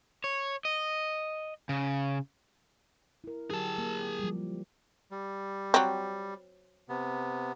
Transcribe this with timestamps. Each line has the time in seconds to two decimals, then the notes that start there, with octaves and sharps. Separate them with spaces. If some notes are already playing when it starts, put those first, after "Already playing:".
0.24 C#5
0.65 D#5
1.69 C#3
3.24 E4 A#4
3.51 D3 F#3 G4 G#4 A5
3.78 A#3
4.19 F3 G3
5.11 G3
5.74 F#3 C4
6.89 C3 B3